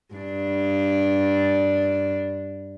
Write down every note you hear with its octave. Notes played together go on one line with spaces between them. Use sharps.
G2 D4